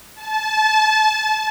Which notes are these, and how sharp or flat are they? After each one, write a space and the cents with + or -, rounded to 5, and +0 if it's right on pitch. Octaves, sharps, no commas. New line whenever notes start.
A5 -25